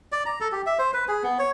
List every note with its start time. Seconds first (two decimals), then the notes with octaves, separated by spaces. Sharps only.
0.12 D5
0.26 A#5
0.40 A4
0.52 G4
0.66 E5
0.79 C5
0.94 B4
1.08 G#4
1.23 B3
1.39 C#5